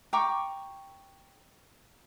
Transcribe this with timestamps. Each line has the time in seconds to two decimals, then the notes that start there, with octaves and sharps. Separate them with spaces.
0.13 G5 A#5 C#6 D6